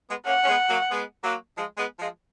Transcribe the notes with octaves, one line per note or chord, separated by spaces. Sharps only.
G#3 B3
A#3 C#4 F#5
C#4
G#3 B3
F#3 A#3
G#3 B3
F#3 A#3
F3 G#3
G#3 B3
F3 G#3